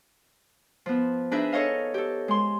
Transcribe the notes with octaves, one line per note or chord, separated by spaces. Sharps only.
F3 B3
D4 D#4 G#4 B4 E5
A4 C#5 D#5 F5
G4 A4
G#3 C6